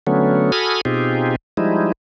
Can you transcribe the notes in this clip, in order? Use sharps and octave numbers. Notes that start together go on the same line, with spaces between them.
D3 F#3 A3 B3 C#4
F#4 A4 G#5 B5 D#6 F6
B2 C4 D#4 F4 G4 G#4
F3 G3 G#3 D#4 E4